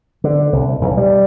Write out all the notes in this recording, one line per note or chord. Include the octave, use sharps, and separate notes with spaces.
D3
C2
B1
G3